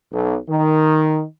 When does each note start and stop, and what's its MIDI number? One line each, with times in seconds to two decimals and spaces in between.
0.12 0.38 35
0.49 1.22 51